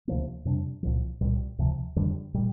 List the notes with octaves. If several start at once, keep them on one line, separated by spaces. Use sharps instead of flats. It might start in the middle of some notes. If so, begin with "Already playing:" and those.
D2 C3 F3 A#3
F2 C3 G3 D4
C2 A#2 F3
C2 A#2 G3
D2 C3 F3
F2 D3 G3
A#2 G3